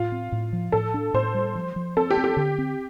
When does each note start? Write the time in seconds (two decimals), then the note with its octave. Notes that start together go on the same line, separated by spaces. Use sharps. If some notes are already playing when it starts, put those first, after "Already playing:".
Already playing: A2 F4
0.12 C4
0.32 A2
0.53 F3
0.72 A2 A4
0.94 D4
1.14 A2 C5
1.34 G3
1.55 F3
1.76 F3
1.97 C4 A4
2.10 G4
2.17 C4
2.24 G4
2.37 D3
2.58 C4